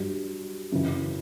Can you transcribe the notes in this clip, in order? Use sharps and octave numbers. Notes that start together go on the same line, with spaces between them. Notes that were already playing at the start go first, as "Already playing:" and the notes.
Already playing: G2 F#3
F#2 C#3 E3